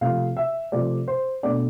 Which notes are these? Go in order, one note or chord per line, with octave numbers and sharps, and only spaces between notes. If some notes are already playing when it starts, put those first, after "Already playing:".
C3 F3 A3 C4 F5
E5
C3 F3 A3 C4 D5
C5
B2 A3 D4 D5